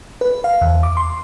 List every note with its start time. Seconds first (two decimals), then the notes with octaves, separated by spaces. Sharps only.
0.21 B4
0.44 F5
0.61 E2
0.83 D6
0.97 C6